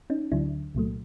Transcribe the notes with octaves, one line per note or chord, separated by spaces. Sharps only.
C#4 D#4
D2 D3 F#3 D4 E4
C2 A#2 F#3 A3